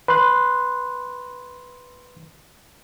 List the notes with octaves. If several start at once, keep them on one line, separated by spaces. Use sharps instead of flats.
B4 B5 C6 F#6